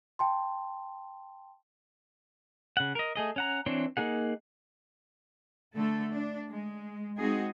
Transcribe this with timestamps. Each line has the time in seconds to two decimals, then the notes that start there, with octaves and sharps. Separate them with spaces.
0.19 G5 A5 C6
2.77 C#3 F#5
2.95 A#4 D#5
3.16 A3 G#4 D#5
3.36 C#4 F#5 A#5
3.66 E3 C4 D4 C#5 C6
3.97 A#3 D#4 G#4 F#5
5.76 D3 A3 A4
6.14 D4
6.53 G#3
7.18 G#3 C4 D#4 F#4 G#4